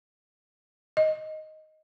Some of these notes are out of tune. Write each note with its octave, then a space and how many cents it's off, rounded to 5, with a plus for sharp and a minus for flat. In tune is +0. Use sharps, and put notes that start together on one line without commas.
D#5 +0